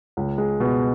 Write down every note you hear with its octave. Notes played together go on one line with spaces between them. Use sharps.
C#2
G#3
B2